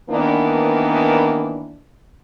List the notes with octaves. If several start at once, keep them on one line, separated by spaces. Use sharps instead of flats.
D#3 E3 A#3 B3 D4